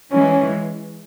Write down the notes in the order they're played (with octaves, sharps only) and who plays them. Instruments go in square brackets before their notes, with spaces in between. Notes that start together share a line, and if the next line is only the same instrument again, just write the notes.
[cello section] E3 G#3 [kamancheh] C#4